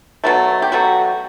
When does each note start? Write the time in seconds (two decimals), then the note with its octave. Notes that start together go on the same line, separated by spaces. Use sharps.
0.24 B2 F#3 A3
0.62 G4
0.72 B2 F#3 A3 F#4